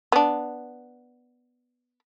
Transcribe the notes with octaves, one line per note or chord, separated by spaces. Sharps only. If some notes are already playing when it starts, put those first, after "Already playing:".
B3 D4